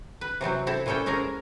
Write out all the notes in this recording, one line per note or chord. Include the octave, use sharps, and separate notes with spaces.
B4
C3 E3 F#3 C4
C4 E4 A4
A#2 E3 G3 C#4 A4 G5
G#3 C4 C#4 G#4 A#4